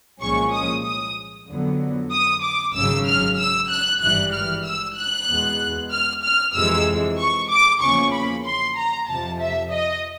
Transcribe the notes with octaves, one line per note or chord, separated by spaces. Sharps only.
C2 A#2 F3 G#3 C#4 C#6
D#6
D#6
F2 D3 F#3 B3
D#6
D6
G#1 F#2 C#3 F#3 E6
F6
E6
F#6
G#1 G2 E3 G3 F#6
F6
E6
F#6
E2 B2 G#3 B3
F6
F6
F2 C3 E3 G#3 E6
C#6
D6
E2 C#3 F3 A#3 C#4 C#6
B5
C6
A#5
F2 C3 F3 A5
E5
D#5